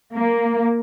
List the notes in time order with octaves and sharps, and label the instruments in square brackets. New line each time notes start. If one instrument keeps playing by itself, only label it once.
[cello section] A#3